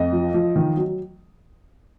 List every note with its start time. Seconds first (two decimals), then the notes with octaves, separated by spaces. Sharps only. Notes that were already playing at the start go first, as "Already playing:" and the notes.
Already playing: F2 D#5
0.12 F3
0.34 F3
0.56 D#3
0.77 F#3